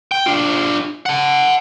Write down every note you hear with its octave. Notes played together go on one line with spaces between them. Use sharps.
G5
D4 F4
F#5 A5